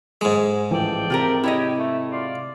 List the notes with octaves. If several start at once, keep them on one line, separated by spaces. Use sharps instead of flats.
G#2 G#3
A1 E3 F3 A4 D5 G5
C3 F4 G4 A#4
E4 G4 C#5 D#5
A3
F4 D5